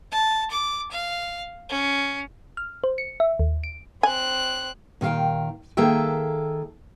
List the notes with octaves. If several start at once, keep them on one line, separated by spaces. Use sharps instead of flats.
A5
D6
F5
C#4
F6
C5
C#7
E5
D#2
D7
C4 G#5 F#6
A#2 D#3 F#4 F5 G5
D#3 A#3 G#4 A4 E5 G5